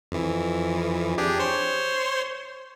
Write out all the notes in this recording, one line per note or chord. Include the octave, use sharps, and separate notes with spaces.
F2 E3
D4 G4 G#4
C5 C#5 C6